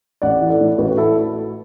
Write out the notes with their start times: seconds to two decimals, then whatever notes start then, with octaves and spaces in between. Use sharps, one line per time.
0.22 A1 D5 F#5
0.42 E3
0.50 A4 D5
0.60 A2
0.78 A1 F#4 B4
0.92 F#4
0.97 E4 A4